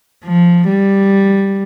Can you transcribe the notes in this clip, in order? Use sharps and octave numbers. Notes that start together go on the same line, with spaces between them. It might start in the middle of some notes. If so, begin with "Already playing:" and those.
F3
G3